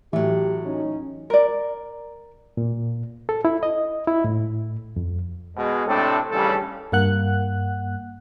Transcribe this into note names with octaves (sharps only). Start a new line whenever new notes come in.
A2 E3 F#3 G4
C#4 D#4
A#4 D5
A#2
A4
E4
D#5
E4
A2
F2
B2 G#3
A2 C3 C4 D4 A4
A1 D#2 C#3 G3 A4
G2 A#3 F#5 F#6